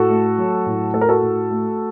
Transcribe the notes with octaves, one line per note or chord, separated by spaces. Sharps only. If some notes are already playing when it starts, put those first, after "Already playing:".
Already playing: A2 F#4 A4
A3
F#3
A2
A3 A4
A#4
F#4 A4
A2
A3